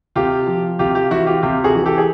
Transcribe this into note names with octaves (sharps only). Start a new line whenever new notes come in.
C3 F4 G4
F3
C3 F4 G4
F4 G4
E3 E4 F#4
F4 G4
C3 F4 G4
F#4 G#4
E3
G4 A4
G#4